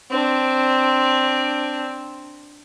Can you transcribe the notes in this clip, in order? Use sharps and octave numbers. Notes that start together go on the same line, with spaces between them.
C4 D4